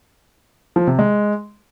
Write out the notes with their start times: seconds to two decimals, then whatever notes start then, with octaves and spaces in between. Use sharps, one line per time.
0.76 F3
0.87 C3
0.99 G#3